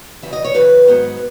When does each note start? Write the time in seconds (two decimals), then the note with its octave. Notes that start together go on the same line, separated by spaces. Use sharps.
0.22 F#2 C#3 E3 E5
0.33 D#5
0.44 C#5
0.55 F#2 C#3 E3 B4
0.87 G#2 D#3 F#3 B3